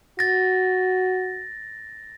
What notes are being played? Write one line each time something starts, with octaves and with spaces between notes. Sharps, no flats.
F#4 A6 A#6